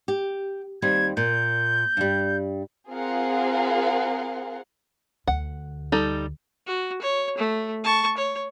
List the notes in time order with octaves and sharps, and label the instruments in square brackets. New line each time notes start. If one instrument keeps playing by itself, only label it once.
[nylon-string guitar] G4
[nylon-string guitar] D#2 G3 C4 [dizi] G#6
[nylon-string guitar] A#2 [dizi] G6
[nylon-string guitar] G2 G3
[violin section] C4 F4 G#4 A#4 F5 F#5
[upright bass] D2 [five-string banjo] F#5
[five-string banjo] G3 D#4 A4
[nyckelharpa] F#4
C#5
A3
A5 C#6
C#5